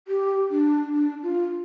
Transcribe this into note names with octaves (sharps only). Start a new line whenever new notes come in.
G4
D4
D4
F4